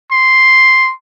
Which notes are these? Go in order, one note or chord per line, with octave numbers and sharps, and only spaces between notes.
C6